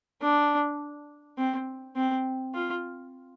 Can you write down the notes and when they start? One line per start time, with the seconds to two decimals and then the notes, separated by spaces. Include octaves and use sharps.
0.22 D4
1.38 C4
1.96 C4
2.54 F4